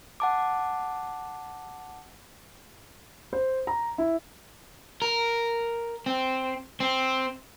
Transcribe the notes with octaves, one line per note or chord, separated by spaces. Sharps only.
F#5 A5 D6
C5
A#5
E4
A#4
C4
C4